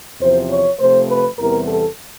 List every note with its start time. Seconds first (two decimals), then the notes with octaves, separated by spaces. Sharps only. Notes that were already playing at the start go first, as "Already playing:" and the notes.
0.20 E2 C3 F3 C5
0.50 C#5
0.79 C3 F3 A3 C5
1.09 B4
1.38 E2 C3 E3 G3 B3 A#4
1.68 A4